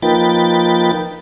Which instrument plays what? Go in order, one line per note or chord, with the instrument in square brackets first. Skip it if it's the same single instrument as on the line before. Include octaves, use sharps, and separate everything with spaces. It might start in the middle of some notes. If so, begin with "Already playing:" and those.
[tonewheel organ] F3 A#3 D#4 B4 G5 A6